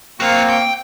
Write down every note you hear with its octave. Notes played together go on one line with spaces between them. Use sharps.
A#3 C4 F#4 F5 C#6
G5